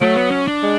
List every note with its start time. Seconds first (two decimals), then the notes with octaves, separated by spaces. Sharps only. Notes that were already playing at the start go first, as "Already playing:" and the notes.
0.01 F#3 A3
0.16 B3
0.31 C#4
0.48 D4
0.63 G#3